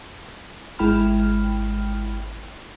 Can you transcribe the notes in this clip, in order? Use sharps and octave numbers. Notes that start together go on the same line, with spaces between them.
G#1 G#3 E4 G5 B5 F6